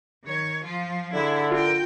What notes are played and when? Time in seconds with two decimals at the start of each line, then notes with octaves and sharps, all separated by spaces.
0.24 D#3 C#5
0.64 F3 F4
1.14 D3 E4 G#4
1.52 F4 A#4 G5